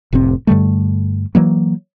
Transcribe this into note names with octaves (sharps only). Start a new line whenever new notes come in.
F1 A2 C3 C4
G2 D3 G3 A3
E3 F#3 A#3